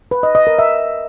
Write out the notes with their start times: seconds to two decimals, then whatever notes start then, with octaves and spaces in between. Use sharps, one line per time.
0.11 B4
0.23 D#5
0.35 D#5
0.47 A#4
0.59 E5